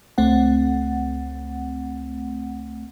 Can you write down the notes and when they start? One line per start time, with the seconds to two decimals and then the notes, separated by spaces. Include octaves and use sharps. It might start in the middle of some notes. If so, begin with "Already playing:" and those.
0.18 C#2 A3 C4 F#5